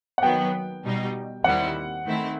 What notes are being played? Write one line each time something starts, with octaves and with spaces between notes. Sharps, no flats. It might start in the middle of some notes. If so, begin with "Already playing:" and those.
F#5
D#3 F#3 B3 G5
B2 G3 D#4
D#2 D#3 G3 C4 E4 F#5
D#3 A3 C4 E4